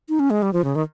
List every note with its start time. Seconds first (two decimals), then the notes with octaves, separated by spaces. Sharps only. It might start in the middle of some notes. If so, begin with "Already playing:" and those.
0.09 D#4
0.20 C#4
0.30 G#3
0.42 G3
0.53 F3
0.64 C#3
0.75 D#3